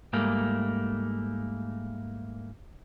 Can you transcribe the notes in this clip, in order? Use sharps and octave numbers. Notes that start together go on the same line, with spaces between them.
G#2 G3 A3 A#3